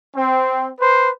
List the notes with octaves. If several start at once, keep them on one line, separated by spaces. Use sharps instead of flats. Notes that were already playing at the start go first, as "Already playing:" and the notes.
C4
B4 C5